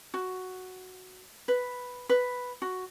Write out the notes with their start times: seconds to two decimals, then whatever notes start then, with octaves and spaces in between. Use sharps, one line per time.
0.14 F#4
1.48 B4
2.09 B4
2.62 F#4